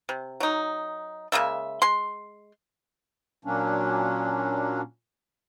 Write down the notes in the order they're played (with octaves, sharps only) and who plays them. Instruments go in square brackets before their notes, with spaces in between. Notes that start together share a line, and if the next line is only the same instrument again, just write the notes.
[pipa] C3
F#3 D#4
C#3 G#3 A#3 E5
G#3 C6
[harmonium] A#2 F#3 A#3 C#4 D4